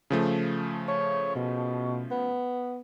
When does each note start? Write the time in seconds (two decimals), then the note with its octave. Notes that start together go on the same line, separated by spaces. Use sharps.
0.10 C#3 F3 A3
0.88 C#5
1.35 B2
2.11 B3